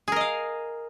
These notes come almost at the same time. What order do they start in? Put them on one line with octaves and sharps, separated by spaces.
G#4 A#4 D#5 F5